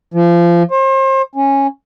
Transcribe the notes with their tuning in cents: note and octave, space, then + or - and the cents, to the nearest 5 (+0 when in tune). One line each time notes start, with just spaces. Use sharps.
F3 -25
C5 +35
C#4 -10